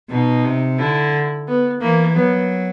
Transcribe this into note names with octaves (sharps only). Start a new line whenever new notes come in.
B2 D#4
C3
D3 E4
B3
E3 A#3
F#3 B3